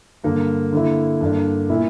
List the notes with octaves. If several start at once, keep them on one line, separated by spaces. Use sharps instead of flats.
G2 D3 A#3
D3 A#3 E4
G2 D3 A#3 D4
A#2 A#3 E4